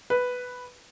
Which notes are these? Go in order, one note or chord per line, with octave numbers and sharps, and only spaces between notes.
B4